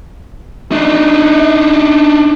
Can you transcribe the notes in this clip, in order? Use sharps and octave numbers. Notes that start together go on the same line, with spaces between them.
D4 D#4